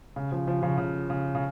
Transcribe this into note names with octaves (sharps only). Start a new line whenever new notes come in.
C#3
C#3 F3
C#3 F3
C#3 F3
C#3
C#3
C#3